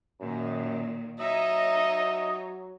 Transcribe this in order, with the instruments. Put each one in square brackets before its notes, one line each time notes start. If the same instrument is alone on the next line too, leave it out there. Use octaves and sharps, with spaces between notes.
[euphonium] F#2 [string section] A#2 D#3
[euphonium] F#3 [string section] D#4 C#5 [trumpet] D#5 [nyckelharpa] E5